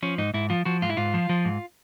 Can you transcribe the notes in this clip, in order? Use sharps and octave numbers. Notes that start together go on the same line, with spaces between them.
F3 C#4
G#2 D#4
G#2 E4
F3 F4
F3 F#4
G#2 F4
E4
G#2 F4
F3
F3
G#2